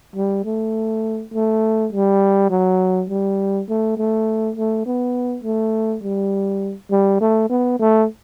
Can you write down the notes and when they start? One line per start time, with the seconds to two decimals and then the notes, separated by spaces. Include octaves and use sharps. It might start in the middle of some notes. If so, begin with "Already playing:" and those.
0.16 G3
0.45 A3
1.34 A3
1.93 G3
2.50 F#3
3.10 G3
3.69 A3
3.97 A3
4.56 A3
4.86 B3
5.44 A3
6.03 G3
6.91 G3
7.21 A3
7.50 B3
7.80 A3